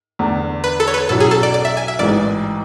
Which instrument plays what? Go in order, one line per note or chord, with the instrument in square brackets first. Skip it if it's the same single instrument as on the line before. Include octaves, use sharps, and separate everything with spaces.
[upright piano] E2 D3 A3 D4
[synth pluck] B4
A4
C#5
B4
[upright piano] B1 B2 F#3 C#4 E4 [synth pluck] A4
[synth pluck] G#4
A4
D5
D5
E5
G#5
E5
[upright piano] A1 G#2 E3 G#3 [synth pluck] D5